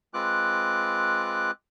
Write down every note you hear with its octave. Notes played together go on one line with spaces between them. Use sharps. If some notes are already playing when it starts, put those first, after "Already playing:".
G#3 C4 F4 B4 D6 F#6